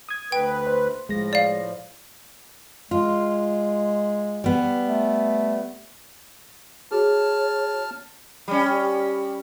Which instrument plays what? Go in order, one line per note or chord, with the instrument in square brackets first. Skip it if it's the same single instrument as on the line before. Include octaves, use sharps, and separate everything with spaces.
[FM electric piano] D#6 G#6
[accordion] D2 B4 [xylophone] G5
[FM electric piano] C5
[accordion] A2 F3 [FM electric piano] G#3 A#6
[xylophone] D5 F5
[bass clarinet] G#3 [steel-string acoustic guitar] F4
[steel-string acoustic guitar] G3 B3
[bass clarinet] A3
[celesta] F#4 G#4 [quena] C#5 [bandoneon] A5 F6
[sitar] G3 C#4